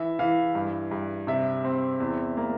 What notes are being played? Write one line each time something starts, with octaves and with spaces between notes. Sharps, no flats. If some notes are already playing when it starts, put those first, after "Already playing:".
Already playing: E3 E5
E3 F5
G2
G2
C3 E5
C4
E2
A#3